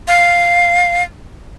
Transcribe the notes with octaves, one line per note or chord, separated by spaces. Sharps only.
F5